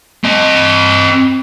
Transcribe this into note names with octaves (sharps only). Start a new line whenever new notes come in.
C4 D#5